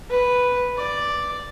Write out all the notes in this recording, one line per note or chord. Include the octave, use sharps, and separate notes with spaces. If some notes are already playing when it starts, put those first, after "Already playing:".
B4
D5